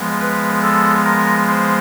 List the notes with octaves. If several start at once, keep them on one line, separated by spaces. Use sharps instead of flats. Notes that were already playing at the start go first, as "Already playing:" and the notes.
Already playing: F3 G#3 B3
B4
A4
A#4
C5